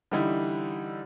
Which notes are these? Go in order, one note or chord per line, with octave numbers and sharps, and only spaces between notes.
D3 E3 G3 D#4 E4